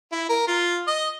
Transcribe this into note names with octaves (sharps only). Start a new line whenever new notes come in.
E4
A#4
F4
D#5